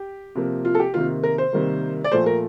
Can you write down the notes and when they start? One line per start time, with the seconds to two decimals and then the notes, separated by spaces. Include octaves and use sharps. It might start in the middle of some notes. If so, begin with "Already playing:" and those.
Already playing: G4
0.35 C3 F3 A#3
0.65 F4
0.75 A4
0.80 G4
0.93 C3 D#3 A#3 F4
1.23 A#4
1.38 C5
1.53 C3 D#3 G3 A#3
2.04 D5
2.12 A#2 F3 A3 C5
2.26 A#4